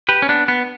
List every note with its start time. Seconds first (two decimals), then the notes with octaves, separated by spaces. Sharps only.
0.09 G4 B4
0.22 C#4
0.29 B3 D4
0.48 B3